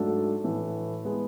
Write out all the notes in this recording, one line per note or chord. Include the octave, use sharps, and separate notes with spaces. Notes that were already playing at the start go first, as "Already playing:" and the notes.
Already playing: G#2 F#3 A3 D4 A4
A2 E3 A3
G#3 B3 E4 G#4